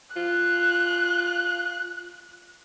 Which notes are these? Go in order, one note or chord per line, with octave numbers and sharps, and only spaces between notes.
F4 F#6